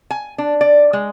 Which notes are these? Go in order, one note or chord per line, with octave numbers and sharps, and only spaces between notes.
G#5
D4
D5
G#3